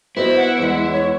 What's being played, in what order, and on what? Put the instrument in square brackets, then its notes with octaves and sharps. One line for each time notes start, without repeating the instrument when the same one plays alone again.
[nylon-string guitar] B3 F#4 D#5 [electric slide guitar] E4 [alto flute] C5
[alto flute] F#5
[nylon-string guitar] E2 G#3
[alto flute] C#5